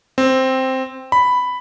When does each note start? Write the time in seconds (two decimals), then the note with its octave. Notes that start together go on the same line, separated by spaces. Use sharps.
0.18 C4
1.12 B5